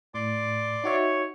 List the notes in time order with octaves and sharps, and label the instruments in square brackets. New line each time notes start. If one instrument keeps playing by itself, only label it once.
[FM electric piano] A2 [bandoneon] D5 C6 D6
[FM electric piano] D#4 F#4 E5 [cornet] C#5